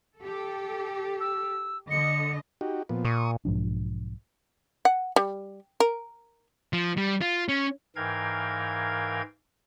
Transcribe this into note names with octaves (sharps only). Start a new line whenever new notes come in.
G4 A4
E6
D3 D#5 C#7
D#4 F#4 G4
A#2 F3 B3
A#2 C#6 D#6
B1 G#2 F3 D4
F#5
G3
A#4
F3
G3
F4
C#4
G#2 E3 A#4 F5 G5 G#6